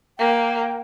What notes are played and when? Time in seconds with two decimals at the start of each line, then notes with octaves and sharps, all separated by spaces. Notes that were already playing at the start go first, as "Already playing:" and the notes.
0.19 A#3 G5